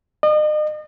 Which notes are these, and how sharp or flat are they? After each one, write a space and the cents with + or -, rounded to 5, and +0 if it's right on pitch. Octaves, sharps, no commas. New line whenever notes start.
D#5 -40